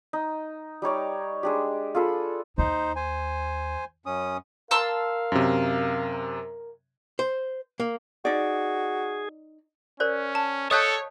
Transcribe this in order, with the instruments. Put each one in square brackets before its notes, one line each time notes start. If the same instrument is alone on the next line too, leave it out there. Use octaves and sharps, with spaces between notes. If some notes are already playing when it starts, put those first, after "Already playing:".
[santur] D#4
G3 D#4 C#5 D5
G#3 D4 G4
F4 G#4 A4 B5
[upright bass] D#2 [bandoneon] D#4 C5
[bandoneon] C5 G#5
F#2 C#4 D#6
[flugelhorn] A#4 [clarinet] F5 [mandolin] A5 C6 E6
[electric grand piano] F#2 C3
[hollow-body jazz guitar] C5
A#3
[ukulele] D#4 D5 [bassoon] F#4 [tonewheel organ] G#4
[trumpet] C#4 [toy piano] A#4 C5 D5
[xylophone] A5
[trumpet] A4 [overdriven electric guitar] C#5 [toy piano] D#5 F5 A5 [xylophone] D#6 F#6 G6